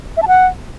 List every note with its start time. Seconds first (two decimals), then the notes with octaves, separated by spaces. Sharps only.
0.17 E5
0.22 A5
0.28 F#5